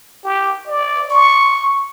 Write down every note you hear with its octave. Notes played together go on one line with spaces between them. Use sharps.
G4
D5
C#6